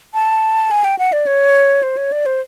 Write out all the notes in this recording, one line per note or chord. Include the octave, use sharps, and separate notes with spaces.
A5
G#5
G5
F#5
D5
C#5
C5
C#5
D5
C5